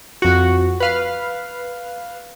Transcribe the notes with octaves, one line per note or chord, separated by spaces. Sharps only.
F2 F#4
B4 F5